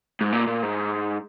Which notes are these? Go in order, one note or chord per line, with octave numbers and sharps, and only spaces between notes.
G#2
A#2
A#2
G#2